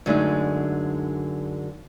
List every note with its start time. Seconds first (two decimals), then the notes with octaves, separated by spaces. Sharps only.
0.06 F#2 D3 G#3 A3 D#4